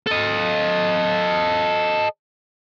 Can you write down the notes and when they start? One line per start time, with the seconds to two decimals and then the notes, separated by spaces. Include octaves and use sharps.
0.07 A4 D#5